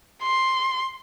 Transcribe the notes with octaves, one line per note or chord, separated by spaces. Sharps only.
C6